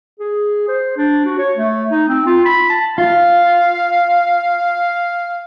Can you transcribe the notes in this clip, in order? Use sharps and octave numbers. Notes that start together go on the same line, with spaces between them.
G#4
C5
D4
F#4
C#5
A3
D#4
C4
F4
B5
A5
F4 F5